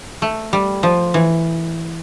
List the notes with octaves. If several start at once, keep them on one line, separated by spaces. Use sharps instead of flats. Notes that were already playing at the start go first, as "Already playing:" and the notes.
A3
G3
F3
E3